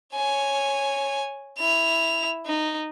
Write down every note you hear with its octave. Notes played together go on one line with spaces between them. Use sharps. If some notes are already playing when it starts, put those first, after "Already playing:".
C#5 G#5
E4 F7
D#4